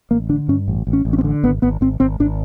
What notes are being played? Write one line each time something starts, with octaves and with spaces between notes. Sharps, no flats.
A1 A#3
D3 D4
G2 C#4
A1
A1
C#4
A1
C#4
C4
D3
G#1 B3
G#1 B3
G#1 C4
G#1 C4
G#1 D4